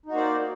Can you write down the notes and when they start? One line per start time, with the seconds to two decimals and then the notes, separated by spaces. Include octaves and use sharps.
0.06 D#4
0.09 F#4
0.12 A#3
0.14 C5
0.17 D5